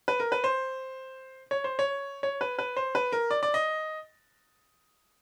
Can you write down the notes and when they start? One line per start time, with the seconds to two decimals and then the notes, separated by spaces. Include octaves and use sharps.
0.08 B4
0.20 A#4
0.32 B4
0.44 C5
1.51 C#5
1.64 C5
1.79 C#5
2.23 C#5
2.41 B4
2.59 B4
2.77 C5
2.95 B4
3.12 A#4
3.31 D5
3.43 D5
3.54 D#5